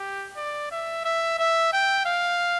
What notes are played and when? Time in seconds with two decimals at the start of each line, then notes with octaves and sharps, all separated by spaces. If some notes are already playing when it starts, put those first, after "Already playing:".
Already playing: G4
0.36 D5
0.71 E5
1.05 E5
1.38 E5
1.73 G5
2.06 F5